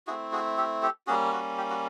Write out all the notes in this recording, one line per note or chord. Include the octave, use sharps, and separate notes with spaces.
A3 C4 E4 F#4 G#4
F#4 G#4
G4 A4
G4 A4
G3 A#3 C#4 F#4 G#4
F#4
G4
F#4